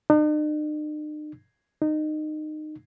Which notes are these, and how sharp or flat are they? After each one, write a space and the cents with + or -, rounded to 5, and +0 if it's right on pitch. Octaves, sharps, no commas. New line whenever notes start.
D#4 -45
D#4 -20